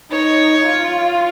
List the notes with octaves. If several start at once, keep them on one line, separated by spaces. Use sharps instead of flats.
D#4 C#5
F4